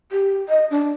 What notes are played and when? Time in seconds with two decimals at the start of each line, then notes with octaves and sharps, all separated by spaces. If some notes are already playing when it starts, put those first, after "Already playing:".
0.12 G4
0.49 D#5
0.71 D4